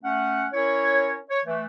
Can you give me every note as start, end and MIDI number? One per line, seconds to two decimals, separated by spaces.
0.03 0.46 57
0.03 0.46 61
0.03 0.46 78
0.54 1.18 61
0.54 1.18 64
0.54 1.18 70
0.54 1.18 73
1.29 1.39 73
1.45 1.65 52
1.45 1.65 57